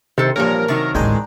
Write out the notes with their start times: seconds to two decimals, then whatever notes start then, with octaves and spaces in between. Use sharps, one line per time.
0.18 C3 D#3 A4 C5
0.36 G2 A#2 E3 F3 A#4 C#5
0.68 C3 D#3 F#3 C#6
0.95 A1 D2 G#3 D4 G5 A#5